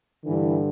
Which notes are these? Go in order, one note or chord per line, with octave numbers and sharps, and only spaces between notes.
G2 D3 E3